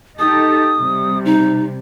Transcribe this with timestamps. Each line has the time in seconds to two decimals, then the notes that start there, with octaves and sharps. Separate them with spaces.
0.19 D#4 G4 A4 D#6
0.78 C3 G3
1.25 D#4